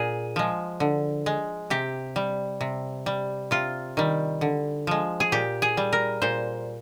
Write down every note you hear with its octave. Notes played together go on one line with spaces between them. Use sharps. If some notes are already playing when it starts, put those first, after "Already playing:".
Already playing: A#2 G#4
F3 G#3
D3
G#3
C3 G4
G3
C3
G3
C3 F4
D#3 G3
D3
F3 G#3
G#4
A#2 G4
G#4
G3
A#4
A#2 C5